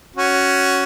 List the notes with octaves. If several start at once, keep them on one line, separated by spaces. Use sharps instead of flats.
C#4 F#4